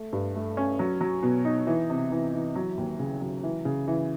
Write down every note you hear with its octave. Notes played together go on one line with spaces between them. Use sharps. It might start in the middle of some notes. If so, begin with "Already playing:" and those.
Already playing: A3
G2
A3
C#4
F#3
F#3
B2
D#4
E3
C3
E3
E3
F#3
D#2
C#3
F#3
E3
C#3
E3